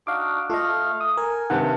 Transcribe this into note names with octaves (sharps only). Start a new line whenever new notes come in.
D4 D#4 F#4 F5 D6
A3 F4 A4 D#5 F5
D#6
A#4 G#5
G2 C3 D#3 F#5